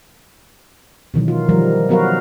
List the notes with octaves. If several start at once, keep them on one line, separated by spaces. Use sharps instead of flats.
B2 D#3 E3 F#3
F4
D#3 F3 G3 A#4
F#3 B3 F#4 A#4 B4 F5